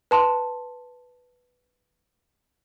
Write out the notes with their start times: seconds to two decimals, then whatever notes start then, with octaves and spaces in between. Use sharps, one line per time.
0.11 B4 A5 C6